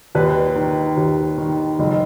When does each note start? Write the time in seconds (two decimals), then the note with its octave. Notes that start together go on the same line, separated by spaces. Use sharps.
0.15 D#2 B4
0.55 D#3
0.97 D#2
1.38 D#3
1.79 F#1